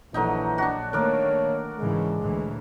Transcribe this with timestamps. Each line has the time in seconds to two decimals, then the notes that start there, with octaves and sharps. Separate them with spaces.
0.14 A#1 D3 E3 F#3 D#4
0.58 D4 F#4
0.93 D#3 A3 A#3 A#4 C#5 D5
1.79 G#2 C#3 E3 G#3
2.22 D2 A#2 E3